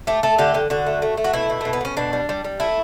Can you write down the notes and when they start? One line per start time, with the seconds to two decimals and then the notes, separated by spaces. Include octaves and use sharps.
0.07 A3 G4
0.23 A3 A4
0.39 D3 G4
0.54 D3
0.70 D3 F#4
0.86 A3
1.02 A3
1.17 A3
1.24 F#4
1.33 B2 E4
1.50 B2
1.61 B2 A3
1.73 B3
1.81 B2 C#4
1.97 B2 D4
2.13 G3
2.29 G3
2.44 G3
2.60 A3 E4